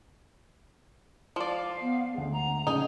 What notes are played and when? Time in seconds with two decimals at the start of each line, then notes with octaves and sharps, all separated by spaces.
1.36 F3 D5 F5
1.81 B3
2.14 D2 G#3 F#5
2.33 A#5
2.67 A#1 C#3 C#4 D#4 G#4